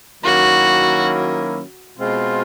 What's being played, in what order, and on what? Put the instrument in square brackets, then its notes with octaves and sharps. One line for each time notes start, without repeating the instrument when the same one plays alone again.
[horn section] D#3 F#3 A#3 C#4 E4 [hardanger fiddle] F#4
[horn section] B2 G#3 C4 F4